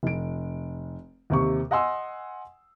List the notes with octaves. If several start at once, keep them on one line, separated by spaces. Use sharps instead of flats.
F1 D7
D#2 C3 C#6
D#5 F#5 G#5 C6 E6